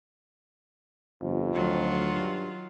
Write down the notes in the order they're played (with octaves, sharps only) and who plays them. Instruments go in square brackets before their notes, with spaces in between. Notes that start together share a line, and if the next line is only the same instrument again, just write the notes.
[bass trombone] G1 [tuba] F2
[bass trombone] D2 [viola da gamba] D#3 F#3 F4
[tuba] G2